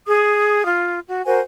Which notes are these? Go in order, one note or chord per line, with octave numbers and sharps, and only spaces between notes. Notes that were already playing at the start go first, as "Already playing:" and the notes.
G#4 D#6
F4
F#4
F#4 A#4 C5 G#5